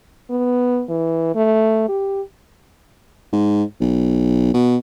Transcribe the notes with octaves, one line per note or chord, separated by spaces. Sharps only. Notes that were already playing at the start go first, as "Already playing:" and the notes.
B3
E3
A3
G4
G#2
B1
B2